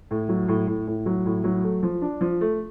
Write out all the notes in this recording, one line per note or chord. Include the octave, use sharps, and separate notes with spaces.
A2
F#3
A2
A2
A2
F#3
A2
F#3
A3
F3
D4
F3
A3